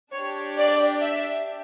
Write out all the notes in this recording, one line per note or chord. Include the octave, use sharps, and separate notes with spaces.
D4 G4 C#5
D5
E5